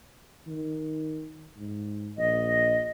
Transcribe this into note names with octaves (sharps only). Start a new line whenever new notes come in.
D#3
G#2
A#1 D#5